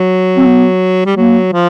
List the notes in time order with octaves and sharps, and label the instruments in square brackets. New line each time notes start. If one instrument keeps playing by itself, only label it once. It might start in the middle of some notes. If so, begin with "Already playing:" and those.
Already playing: [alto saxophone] F#3
[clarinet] C4
B3
[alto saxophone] G3
[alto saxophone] F#3 [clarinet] A#3
[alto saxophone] F3